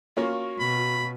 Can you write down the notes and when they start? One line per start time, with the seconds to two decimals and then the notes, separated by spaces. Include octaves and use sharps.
0.17 A#3 C#4 F4 F#4
0.59 B2 B5